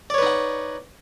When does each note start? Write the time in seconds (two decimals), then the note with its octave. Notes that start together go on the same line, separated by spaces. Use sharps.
0.10 D5
0.14 C#5
0.18 B4
0.22 D#4
0.26 F#5